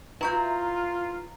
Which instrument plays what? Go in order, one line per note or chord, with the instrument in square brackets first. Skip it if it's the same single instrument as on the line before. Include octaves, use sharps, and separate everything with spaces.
[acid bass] E4 [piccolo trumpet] F4 [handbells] B4 C#6 G6 [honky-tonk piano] A#5